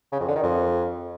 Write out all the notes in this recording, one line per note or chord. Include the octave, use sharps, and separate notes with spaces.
C#3
F2
D3
D#3
F2